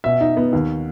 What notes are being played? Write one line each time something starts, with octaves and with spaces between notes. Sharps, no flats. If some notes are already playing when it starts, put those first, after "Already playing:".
B2 E5
D#4
B3
D#2